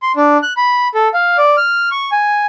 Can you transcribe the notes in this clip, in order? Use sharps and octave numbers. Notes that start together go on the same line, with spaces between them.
C6
D4
F#6
B5
A4
F5
D5
F6
C#6
G#5